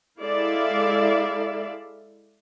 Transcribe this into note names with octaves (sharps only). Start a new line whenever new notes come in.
G#3 E4 A4 D5 E5 F5